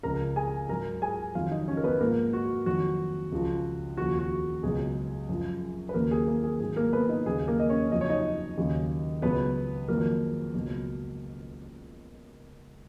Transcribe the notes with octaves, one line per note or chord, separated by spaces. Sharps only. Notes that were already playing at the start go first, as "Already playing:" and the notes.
C#2 C#3 F3 A#4 A#5
G#4 G#5
G#2 F#3 A#4 A#5
G#4 G#5
F2 D#3 F#3 F4 F5
D#4 D#5
C#4 C#5
A#4
B3 B4
G#2 F3 A#3 A#4
F#4
F2 D#3 F#3 F#4
C#2 C#3 F3
D#2 C#3 F3 F#4
F#4
C#2 B2 F#3 G#4
F#2 F3
B4
D#2 C#3 F#3 A#3 A#4
G#4
A#3 A#4
G#4
G#2 D#3 F#3 G#4
A#3 A#4
B3 B4
D#4 D#5
D#2 C#3 F#3 G#4
A#3 A#4
D#5
C#4 C#5
F2 C#3 F#3 D#5
C#5
D#4 D#5
D#2 C#3 F#3
C#2 B2 F#3 B3 B4
F2 D#3 F#3 A#3 A#4
C#2 B2 F#3